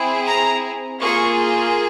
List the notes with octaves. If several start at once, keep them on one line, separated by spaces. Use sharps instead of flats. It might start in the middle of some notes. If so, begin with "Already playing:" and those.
Already playing: C4 E4 G#4
A#5
A#3 F4 G#4 C#6